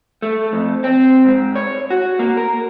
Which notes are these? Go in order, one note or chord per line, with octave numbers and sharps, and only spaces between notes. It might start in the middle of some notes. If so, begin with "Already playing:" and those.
A3
F2
C4
G#2
C#5
F#4
A#3
A#4